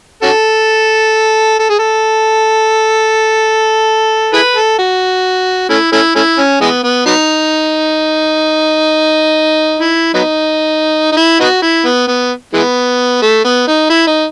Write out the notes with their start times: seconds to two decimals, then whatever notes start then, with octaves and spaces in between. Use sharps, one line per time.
0.23 C#4 F#4 A4
1.59 A4
1.70 G#4
1.79 A4
4.33 E4 G#4 B4
4.56 A4
4.79 F#4
5.70 A3 C#4 E4
5.93 A3 C#4 E4
6.16 A3 C#4 E4
6.38 C#4
6.61 E3 G#3 B3
6.84 B3
7.06 F#3 B3 D#4
9.80 E4
10.14 F#3 B3 D#4
11.12 D#4
11.17 E4
11.40 B3 D#4 F#4
11.62 E4
11.85 B3
12.08 B3
12.53 E3 G#3 B3
13.22 A3
13.44 B3
13.67 D#4
13.90 E4
14.07 D#4